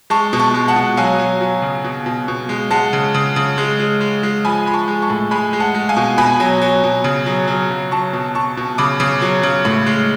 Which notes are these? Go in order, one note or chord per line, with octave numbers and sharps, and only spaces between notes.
G#3 A5 C#6
B2
A5 C#6
G#3
F#5 A5
B2
F#3 F5 G#5
F#3
F#3
C#3
B2
B2
B2
G#3
G#3 F#5 A5
C#3
C#3
C#3
G#3
G#3
G#3
G#3
F3 G#5 B5
G#3 B5
A5 C#6
G#3
A5 C#6
A2
G#3 G#5 B5
G#3
F#5 A5
G#3
F5 G#5
B2
B2 G#5 B5
F#3
F#3
B2
C#3
F#3
F#3
C#3
F#3 A5 C#6
B2
B2 A5 C#6
B2
C#3 B5 D6
C#3
F#3
C#3
A2
G#3